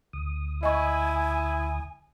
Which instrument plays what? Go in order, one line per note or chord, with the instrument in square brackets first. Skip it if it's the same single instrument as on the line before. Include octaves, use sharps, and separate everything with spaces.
[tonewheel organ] D2 D#6
[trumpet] E4 [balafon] D#5 C#6 [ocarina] G#5